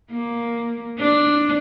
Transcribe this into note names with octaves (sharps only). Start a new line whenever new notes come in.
A#3
D4